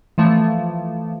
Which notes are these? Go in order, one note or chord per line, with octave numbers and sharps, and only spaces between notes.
E3 F3 A3